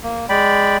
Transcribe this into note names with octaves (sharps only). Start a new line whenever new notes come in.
A#3
G#3 D5 G5 B5